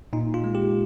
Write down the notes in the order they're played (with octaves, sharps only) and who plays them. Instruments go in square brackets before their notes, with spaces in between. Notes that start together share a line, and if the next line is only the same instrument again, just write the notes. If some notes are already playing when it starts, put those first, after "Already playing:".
[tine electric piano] A#2 D#4
F4
G#3
G4